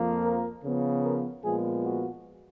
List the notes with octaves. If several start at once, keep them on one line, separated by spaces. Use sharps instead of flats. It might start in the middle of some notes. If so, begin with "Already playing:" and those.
Already playing: F2 F3 A#3
A#4
C#3 F3 B3
A#4
A#2 F3 G#3 B3 G#4
F#4